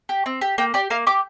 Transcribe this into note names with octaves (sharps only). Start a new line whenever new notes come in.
G4
C4
G4
A#3 G5
G4 D5
A#3 F5
G4 D6